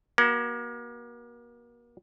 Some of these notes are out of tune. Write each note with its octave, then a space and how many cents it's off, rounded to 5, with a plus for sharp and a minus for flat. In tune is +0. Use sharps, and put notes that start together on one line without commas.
A#3 +35 F#4 +30